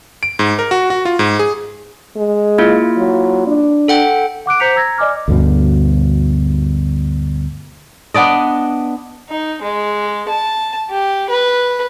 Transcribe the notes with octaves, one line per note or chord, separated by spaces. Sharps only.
D7
G#2
A#4
F#4
F#4
F4
G#2
G#4
G#3
A#3 E4 F4
F#3
D4
A4 F#5 G5
F#5 D6 F#6 D7
C5 A#5 G6 B6 C#7 F7
A#5 E6 G#6 A#6
D5 D#5 G#5 D6 F6
D2 G2 B2
B3 D4 D5 D#5
D#4
G#3
A5
G4
B4